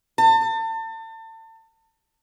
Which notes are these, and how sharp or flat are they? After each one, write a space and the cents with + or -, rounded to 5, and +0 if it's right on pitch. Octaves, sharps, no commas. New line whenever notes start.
A5 +35